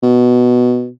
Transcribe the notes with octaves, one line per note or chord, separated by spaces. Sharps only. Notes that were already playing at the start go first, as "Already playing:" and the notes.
B2